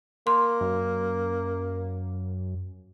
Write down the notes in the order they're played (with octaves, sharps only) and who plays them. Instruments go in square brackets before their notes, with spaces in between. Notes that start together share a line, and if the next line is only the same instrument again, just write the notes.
[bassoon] A#3 [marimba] C6
[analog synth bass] F#2